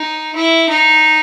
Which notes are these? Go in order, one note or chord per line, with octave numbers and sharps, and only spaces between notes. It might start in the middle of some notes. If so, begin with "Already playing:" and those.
Already playing: D#4
E4
D#4